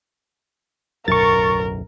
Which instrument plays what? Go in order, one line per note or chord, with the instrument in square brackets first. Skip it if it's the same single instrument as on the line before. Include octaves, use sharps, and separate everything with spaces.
[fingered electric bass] D1 B1 F#2 [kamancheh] A#4 [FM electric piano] C#6 A6